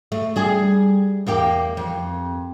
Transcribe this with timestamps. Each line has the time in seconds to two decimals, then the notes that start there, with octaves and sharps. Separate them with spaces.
0.12 A3
0.36 G3 G#4
1.26 E2 A#3 G4
1.77 F2